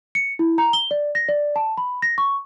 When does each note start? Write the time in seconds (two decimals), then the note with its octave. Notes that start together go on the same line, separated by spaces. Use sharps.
0.15 C#7
0.39 E4
0.58 A#5
0.73 G7
0.91 D5
1.15 A#6
1.29 D5
1.56 A5
1.78 B5
2.02 A#6
2.18 C#6